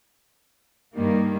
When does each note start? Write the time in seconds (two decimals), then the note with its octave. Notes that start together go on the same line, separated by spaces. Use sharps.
0.94 G2 D#3 G3 A#3